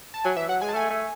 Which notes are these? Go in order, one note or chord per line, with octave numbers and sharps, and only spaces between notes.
A5
F#3 G#5
E3 E5
F#3 F#5
G#3 G#5
A5
A3 G#5
A3